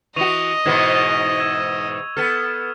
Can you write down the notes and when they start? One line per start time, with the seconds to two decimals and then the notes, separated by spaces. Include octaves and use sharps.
0.16 E3 F#4 D#5 C#6 D#7 F7
0.66 G#2 B2 E3 G#6 E7
1.40 E6 G#6 E7
2.17 B3 A4 F6